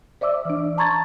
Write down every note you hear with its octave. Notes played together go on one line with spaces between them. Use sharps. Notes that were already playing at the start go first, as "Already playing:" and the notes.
C5 D5 E5 D6 E6
E3 D4
A5 A#5 C6 C#6 G#6 A6